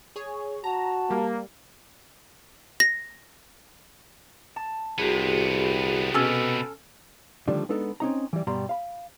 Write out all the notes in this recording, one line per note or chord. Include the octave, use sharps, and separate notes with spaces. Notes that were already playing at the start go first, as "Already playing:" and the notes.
G#4 C#5
F#4 A5 A#5
G3 A#3
A#6
A5
C2 C3 B3 F#4 G#4
B2 C#4 A4
D3 D#3 F3 G3 A3 D4
G#3 B3 D4 D#4 A4
C4 C#4 D#4 A#5
E3 G3
G2 B2 G3 A#5 C6
F5 B5